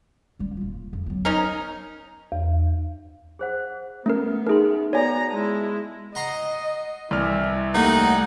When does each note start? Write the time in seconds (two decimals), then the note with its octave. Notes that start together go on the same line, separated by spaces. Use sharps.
0.39 G3 C#4
0.57 D#1 F4
0.93 F2
1.06 F#3 B3
1.25 C#4 D#4 A#4
2.32 E2
3.39 G#4 C5 F#5
4.06 A3 B3 C#4 A#4
4.47 D#4 G#4 A#4 E5 C6
4.93 B3 F#4 A4 C#5 D5 G#5 A#5
5.31 G#3 E4 A5
6.15 D#5 F#5 A#5 C6
7.11 C2 E3 F6
7.75 D#2 A3 D#4 F#5